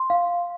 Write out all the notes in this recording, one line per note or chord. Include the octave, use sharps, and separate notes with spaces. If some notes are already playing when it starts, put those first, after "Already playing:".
Already playing: C6
F5